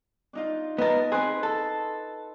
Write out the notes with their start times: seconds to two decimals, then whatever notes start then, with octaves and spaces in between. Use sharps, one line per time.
0.33 D4 D#4 F4
0.78 B3 A#4 D#5 A5
1.12 C4 G#4 B4 C6 F#6
1.43 A4